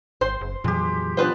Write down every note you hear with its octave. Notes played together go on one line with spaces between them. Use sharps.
G#1 C5 C6
F#1
F2 A#2 E3 F#3 G#3 G4
G3 G#3 B3 D4 F4 B4 C5